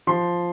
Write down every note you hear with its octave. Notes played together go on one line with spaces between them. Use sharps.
F3 C6